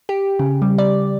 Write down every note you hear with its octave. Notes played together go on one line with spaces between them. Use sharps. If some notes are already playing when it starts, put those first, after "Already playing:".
G4
C#3
G3
D5